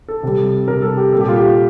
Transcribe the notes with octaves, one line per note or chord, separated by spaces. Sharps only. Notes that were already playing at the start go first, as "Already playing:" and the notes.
A4
C3 G3
C3 G3 A#4
A4
G4
A#2 G3 A4
G4
F4
G4